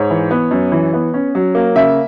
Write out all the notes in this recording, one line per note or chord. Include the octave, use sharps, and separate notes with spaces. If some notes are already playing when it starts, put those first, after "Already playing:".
Already playing: G#2 C#5
E3
B3
F#2
E3
B3
C#4
F#3
A#3
C#3 E5